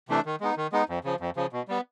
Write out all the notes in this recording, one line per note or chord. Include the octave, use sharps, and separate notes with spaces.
C3 E3 A3 D4
D#3
G#3 B3 D#4
D#3
G#3 B3 D#4
F2
C#3 F3
F2
C#3 F3
B2
G3 B3